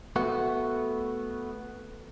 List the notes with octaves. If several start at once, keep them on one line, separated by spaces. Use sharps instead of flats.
A3 B3 F#4